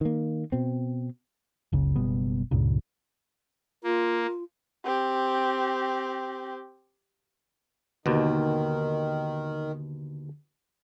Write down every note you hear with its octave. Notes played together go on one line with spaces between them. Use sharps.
D#3 A#3
B2 C4
F#1 C#2 C#3
F#1 B2 G3 B3
C#2 G2 A#2 C#3
A#3 F4
C4 G4
D#2 B2 D3 D#3